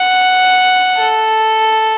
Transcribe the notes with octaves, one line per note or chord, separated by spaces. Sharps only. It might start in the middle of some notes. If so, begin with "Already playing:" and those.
Already playing: F#5
A4